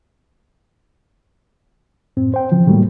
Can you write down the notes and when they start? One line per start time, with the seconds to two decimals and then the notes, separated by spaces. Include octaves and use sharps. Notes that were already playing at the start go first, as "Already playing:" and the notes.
2.17 F#2 A2 C4
2.34 C5 G5
2.52 C#3 E3 F3
2.66 A2 D#3 F#3 G3 A3 A#3